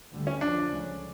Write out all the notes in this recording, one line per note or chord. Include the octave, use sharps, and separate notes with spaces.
D2 D3 G3
C#4
F2 C#3 F3 D4
C#2 C#3 F3 A3 C#4